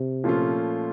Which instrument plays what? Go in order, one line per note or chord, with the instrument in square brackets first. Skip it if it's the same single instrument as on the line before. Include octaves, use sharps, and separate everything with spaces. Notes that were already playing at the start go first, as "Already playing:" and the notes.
Already playing: [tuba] C3
[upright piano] A#2 F3 A3 C#4 F4